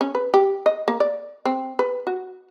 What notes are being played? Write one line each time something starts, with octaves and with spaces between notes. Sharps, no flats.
C#4
B4
G4
D#5
A#3
D5
C4
B4
F#4